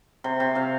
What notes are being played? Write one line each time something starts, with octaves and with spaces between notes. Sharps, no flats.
C3 C6
C3
C3 F5